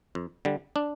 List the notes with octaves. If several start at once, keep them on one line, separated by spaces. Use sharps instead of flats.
F2
D3 G3
D4